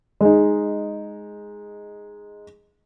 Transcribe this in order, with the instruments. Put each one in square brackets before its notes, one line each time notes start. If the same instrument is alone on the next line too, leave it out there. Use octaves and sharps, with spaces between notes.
[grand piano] G#3 D#4